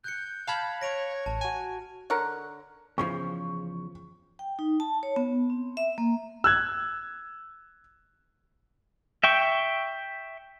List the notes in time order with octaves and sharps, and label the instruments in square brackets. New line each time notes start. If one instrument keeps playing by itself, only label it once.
[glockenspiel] F#6 C#7 [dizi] G6
[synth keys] F5 A5 B5 [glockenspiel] F6 G#6
[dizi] C#5 [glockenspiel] A#6 D7 F7
[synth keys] A1 [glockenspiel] A5
[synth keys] F#4 G#5
[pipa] D3 A#4 C#5 F#5
[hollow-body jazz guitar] E2 C#3 F3 [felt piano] C#6
[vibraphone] G5
D#4
A5
C#5
B3
C4
E5
A#3
[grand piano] E6 F#6 G#6
[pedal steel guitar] E5 G5 C#6